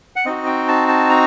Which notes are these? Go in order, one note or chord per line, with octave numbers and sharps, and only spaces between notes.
F#5
C4 D#4 F#4 D#5
G5
A5
A5
A#5